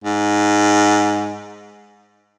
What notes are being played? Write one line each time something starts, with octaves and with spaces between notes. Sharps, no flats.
G#2